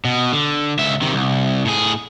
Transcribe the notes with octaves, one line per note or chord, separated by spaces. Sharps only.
B2
D3
C#2 E5
C3 D#3
C2
A2 G#4